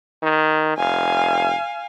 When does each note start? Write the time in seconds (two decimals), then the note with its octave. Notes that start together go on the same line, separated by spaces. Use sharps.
0.22 D#3
0.77 F1 F5 G#5